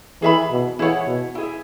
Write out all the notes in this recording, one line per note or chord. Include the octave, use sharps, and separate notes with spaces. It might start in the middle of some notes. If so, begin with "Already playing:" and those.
E3 G#4 E5 B5
B2
E3 E4 G#4 C#5 F#5
B2
E4 G#4 E5